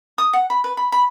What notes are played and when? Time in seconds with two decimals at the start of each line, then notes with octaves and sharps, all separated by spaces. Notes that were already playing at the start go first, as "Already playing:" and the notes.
0.18 D#6
0.33 F#5
0.50 B5
0.64 B4
0.77 B5
0.92 B5